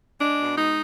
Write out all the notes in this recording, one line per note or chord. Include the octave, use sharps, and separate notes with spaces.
G#3 D4
B2
G#3 D#4